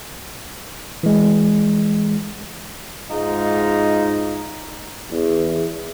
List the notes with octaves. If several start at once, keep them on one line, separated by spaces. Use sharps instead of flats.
E3 G#3
G#2 G#3 D#4 F4
E2